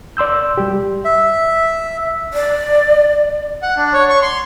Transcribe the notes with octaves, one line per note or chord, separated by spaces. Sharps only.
D5 C6 E6 G6
G3 G4
E5
D5
F#5
D4
C#5
C#6
C6